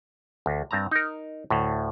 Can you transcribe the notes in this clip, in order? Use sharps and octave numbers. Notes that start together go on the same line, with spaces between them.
D2
G2 C4 A5 A#5
D#4 A#4
D2 A2